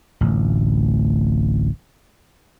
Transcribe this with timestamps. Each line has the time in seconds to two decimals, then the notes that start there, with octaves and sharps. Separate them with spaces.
0.21 D1 A1